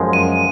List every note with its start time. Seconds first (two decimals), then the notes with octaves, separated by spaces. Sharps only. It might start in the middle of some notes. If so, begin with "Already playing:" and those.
Already playing: F#2 F3 G#3
0.13 D#7